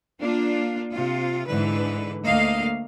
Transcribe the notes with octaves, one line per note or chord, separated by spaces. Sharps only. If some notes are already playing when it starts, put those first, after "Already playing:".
A#3 D4 F4
C3 F4
G#2 D3 E3 B4
D2 A3 A#3 D#5 F5